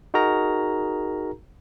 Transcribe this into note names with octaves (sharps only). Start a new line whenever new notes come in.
D#4 F#4 G#4 A#4 A#5